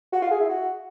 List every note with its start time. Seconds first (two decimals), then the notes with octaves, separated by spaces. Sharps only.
0.13 F#4
0.22 F4
0.31 G#4
0.40 E4
0.49 F#4